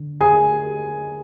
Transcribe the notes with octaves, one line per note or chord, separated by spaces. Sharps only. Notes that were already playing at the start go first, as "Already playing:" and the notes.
Already playing: D3
G#4 G#5